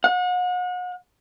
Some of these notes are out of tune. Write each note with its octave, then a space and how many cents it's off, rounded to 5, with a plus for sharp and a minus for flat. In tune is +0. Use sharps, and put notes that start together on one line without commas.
F#5 -40